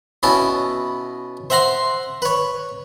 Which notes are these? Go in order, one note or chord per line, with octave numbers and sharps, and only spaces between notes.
B2 B3 C#4 E4 A5
C5 E5 F#5 A#5 C6
B4 C#5